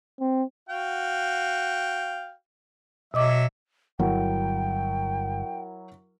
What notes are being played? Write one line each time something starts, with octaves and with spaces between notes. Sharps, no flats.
C4
F#4 F5 G5
B2 F#3 D#5 E5 D6
G1 F#3 E4 A#4 G5